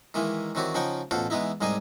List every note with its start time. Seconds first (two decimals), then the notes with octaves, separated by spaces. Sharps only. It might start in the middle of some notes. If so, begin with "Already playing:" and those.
0.14 D#3 E3 G#3 A#3 E4
0.55 D#3 E3 C4 F#4 G4 C#5
0.74 C#3 F3 D#4 F#5 G5 C#6
1.11 A1 B2 F4 A4 C5 F#5
1.30 E3 G#3 B3 D#4 E4
1.61 C2 G#2 G3 D#4 G#4 G#5